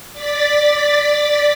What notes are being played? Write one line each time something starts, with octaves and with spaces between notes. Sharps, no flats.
D5 A6 B6